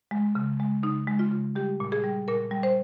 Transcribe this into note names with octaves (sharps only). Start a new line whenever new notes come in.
G#3
C#3
G#3
C#3 D#4
G#3
F4
C#3
G3 G4
A#2
G#4
G3
A#2 A#4
G3
C5